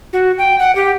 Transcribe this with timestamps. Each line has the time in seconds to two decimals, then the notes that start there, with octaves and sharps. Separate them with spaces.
0.13 F#4
0.38 G5
0.59 F#5
0.75 G4